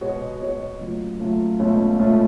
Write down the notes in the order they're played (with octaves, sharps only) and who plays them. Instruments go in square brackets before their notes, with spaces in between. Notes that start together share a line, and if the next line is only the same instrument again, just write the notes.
[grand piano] B2 G#3 B3 F#4 C#5
B2 G#3 B3 F#4 C#5
C#3 F#3 A3 F4
C#3 F#3 A3 F4
C#2 B2 A3 C#4 F4
C#2 B2 A3 C#4 F4